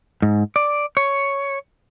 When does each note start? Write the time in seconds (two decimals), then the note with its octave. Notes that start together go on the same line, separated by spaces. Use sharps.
0.22 G#2
0.56 D5
0.97 C#5